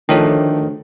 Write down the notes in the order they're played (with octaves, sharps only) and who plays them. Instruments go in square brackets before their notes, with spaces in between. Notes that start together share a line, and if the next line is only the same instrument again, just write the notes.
[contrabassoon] D2 [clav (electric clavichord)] D#3 [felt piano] F3 A3 D4 [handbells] A4 C#5 G5